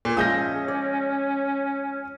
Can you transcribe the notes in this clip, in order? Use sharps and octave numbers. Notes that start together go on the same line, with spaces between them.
A#2
F3 G#3 C#4 E5 D#6 G6 A#6
D5